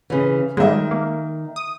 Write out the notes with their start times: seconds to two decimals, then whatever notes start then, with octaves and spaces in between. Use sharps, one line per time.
0.10 C#3 E3
0.57 D#3 G3 G#3 E5
0.91 A#3
1.56 D#6